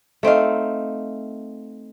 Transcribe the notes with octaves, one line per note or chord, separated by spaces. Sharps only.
A3 C4 D#4 F5